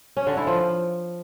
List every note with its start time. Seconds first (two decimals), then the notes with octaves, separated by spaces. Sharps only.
0.17 C#4
0.27 D3
0.37 E4
0.47 F3